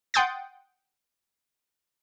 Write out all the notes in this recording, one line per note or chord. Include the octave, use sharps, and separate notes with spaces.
F#5 G5 C6 D#6 G6 A6